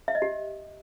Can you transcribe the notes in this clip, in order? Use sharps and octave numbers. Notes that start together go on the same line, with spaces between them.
E5
D#5
G4